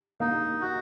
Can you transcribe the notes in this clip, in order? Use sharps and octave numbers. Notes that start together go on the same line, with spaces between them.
A#3 D#4
F#4